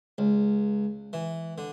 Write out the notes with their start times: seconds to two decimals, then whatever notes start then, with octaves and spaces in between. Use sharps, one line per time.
0.18 C#2
1.13 E3
1.58 D3